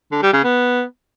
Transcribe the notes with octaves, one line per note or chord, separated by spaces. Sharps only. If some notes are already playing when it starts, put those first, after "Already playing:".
D3
G3
C#3
B3